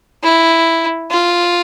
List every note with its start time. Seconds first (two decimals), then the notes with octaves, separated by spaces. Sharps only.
0.24 E4
1.11 F4